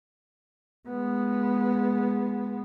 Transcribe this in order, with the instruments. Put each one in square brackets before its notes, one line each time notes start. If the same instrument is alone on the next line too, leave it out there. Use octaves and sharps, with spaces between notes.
[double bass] G#3 B3